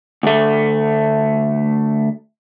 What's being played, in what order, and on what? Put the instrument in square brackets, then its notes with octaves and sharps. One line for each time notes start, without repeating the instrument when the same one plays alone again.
[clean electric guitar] D2 A3